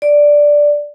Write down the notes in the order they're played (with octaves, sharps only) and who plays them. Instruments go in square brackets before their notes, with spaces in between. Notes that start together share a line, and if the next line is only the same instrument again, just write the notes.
[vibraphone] D5